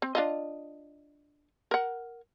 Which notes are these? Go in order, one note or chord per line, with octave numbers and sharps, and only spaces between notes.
C4
D4 F4 D#5
A#4 F#5